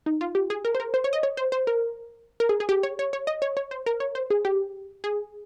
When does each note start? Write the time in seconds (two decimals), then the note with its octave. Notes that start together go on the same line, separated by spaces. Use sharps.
0.06 D#4
0.21 F4
0.35 G4
0.50 G#4
0.65 A#4
0.75 C5
0.80 A#4
0.94 C5
1.04 C#5
1.13 D#5
1.23 C#5
1.37 C5
1.52 C5
1.67 A#4
2.40 A#4
2.49 G#4
2.60 G#4
2.69 G4
2.83 C#5
2.99 C#5
3.13 C#5
3.27 D#5
3.42 C#5
3.57 C#5
3.71 C5
3.86 A#4
4.00 C#5
4.15 C5
4.30 G#4
4.45 G4
5.04 G#4